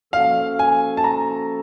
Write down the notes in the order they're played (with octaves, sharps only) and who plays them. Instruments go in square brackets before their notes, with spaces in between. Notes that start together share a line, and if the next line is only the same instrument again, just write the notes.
[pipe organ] F3 A#3 C#4 F#4 A4 [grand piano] F5
[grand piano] G#5
A5
A#5